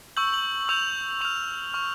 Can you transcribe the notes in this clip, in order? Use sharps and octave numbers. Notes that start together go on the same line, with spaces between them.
C#6 E6 G6 F#7
F#7
C#6 E6 G6 F7
C#6 F6 F7
C#6 F6